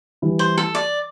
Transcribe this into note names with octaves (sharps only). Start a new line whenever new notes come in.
E3 G3 E4
C5
A4
D5